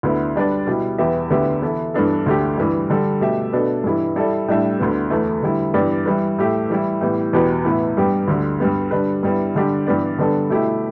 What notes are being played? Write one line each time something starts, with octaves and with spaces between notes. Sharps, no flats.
D2 D3 B3 E4
G3 D4 B4 D5
B2 G3 E4 G4
E2 E3 B3 G4 E5
D2 D3 B3 G4 E5
E3 B3 E4 A4
G2 E3 B3 D4 A4
D2 D3 A3 G4
G2 E3 G3
D3 G3 D4 A4
B2 A3 G4 E5
B2 B3 D4 A4
G2 E3 G3 E4
G3 E4 A4 D5
A2 G3 D4 A4 E5
D2 D3 B3
E2 E3 A3
D3 G3 E4
G2 E3 B3 G4 D5
E3 G3 E4 B4
A2 A3 G4 E5
E3 G3 E4
A2 E3 G3 B3
E2 B2 B3 G4 B4
A2 E3 B3 E4
G2 G3 B3 G4
D2 D3 G3
G2 G3 B3
D3 G3 D4 B4
G2 G3 B3 E4
D3 G3 D4 G4
G2 E3 B3 G4 D5
D3 G3 B3 D4 A4
B2 A3 E4 G4